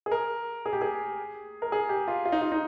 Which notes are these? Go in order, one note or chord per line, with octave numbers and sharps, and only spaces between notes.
G#4
A#4
G#4
G4
G#4
A#4
G#4
G4
F4
F4
D#4
F4
D#4